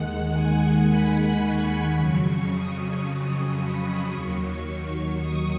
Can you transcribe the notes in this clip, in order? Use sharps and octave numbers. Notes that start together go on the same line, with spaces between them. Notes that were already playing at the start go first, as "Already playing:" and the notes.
Already playing: D#2 D#3 G#3 F#5
G#5
B5
C#6
F2 C#3 F#3 C#6
D#6
C#6
B5
D#2 D#3 F#3 C#6
C#6
D#6